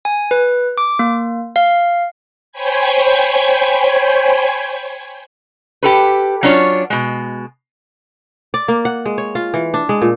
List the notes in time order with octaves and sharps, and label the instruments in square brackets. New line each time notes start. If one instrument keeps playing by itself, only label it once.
[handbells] G#5
B4
D6
A#3
F5
[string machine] C5 C#5 G5 G#5 B5 G#6
[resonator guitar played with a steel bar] G4 A4 B4
F#3 C#4 D4 F4 C#5
B2 G#3
[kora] D5
A#3
F#5
G#3
C#5
F4
E3
D4
G#3
A#2